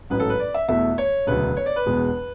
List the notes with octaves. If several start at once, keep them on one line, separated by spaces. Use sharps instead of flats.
A1 G#2 F#3 C#4 B4
A4
B4
D5
E5
E2 B2 A3 E4 E5
C#5
E1 D2 C#3 F#3 B4
C#5
D5
B4
E1 E2 B2 G#3